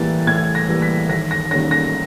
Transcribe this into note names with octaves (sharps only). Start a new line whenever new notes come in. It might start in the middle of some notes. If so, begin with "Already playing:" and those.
Already playing: A2 E3 G3 A#3 A6
A2 G#6
A#6
E3 G3 A#3
B6
D#2 A#6
A#6
D#3 G3 A#3 C#4 A#6
A#6